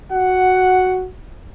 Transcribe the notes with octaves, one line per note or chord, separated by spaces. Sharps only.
F#4 F#5